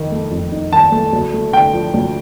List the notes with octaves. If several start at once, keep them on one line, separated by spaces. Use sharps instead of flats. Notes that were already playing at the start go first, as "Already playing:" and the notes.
Already playing: F2 D#3 D#4
A3
F2
D#4
D#3 A5
A3
D2
A3
D3 G5
F3
D2